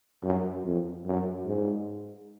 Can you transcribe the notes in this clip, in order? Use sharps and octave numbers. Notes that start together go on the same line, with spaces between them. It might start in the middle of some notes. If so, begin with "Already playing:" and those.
F#2
F2
F#2
G#2